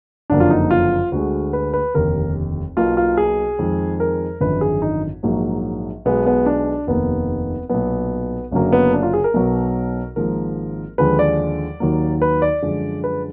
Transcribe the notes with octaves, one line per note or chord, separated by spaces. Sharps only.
F#1 F2 D3 F#3 A#3 D4
F4
D#4
F4
D2 D3 G#3 F#4
B4
B4
F1 D#2 D3 A#4
B1 B2 A#3 F4
F4
G#4
F2 D#3 G#3
A#4
G#1 F#2 D3 F3 B4
G#4
D#4
A#1 G#2 F#3 A#3
B1 B2 G#3 B3
B3
D4
F1 D#2 D#3 A#3 B3
B1 A#2 F#3 B3
F#1 F#2 D3 F#3 A#3
B3
D4
F4
G#4
A#4
B1 B2 F#3
G#1 G#2 F3 A#3 A#4
D#2 D3 F3 G#3 B4
D5
D#2 D#3 F#3 A#3
B4
D5
F#2 D3 F3 G#3
B4